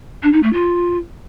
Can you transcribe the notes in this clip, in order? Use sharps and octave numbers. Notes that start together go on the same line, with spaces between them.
D4
D#4
A3
F4